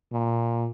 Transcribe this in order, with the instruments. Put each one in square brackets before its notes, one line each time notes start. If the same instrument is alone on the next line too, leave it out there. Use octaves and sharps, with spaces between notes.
[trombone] A#2